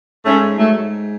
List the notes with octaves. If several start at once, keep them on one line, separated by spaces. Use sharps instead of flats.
G#2 A3 C#4
G#2 F#3 A3